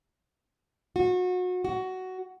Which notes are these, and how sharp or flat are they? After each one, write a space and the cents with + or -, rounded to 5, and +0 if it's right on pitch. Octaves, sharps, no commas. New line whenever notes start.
F#4 -30
F#4 +10